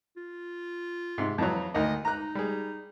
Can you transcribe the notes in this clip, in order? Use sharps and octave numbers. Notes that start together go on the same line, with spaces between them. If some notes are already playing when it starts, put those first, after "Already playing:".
F4
G#2 C3
F2 E3 F#3
D2 D#3 D#4 D#5
D#4 A#5 F#6
G3 G#4